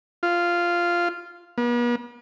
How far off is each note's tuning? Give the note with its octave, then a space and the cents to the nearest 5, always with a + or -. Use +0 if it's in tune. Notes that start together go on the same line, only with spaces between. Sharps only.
F4 -5
B3 -45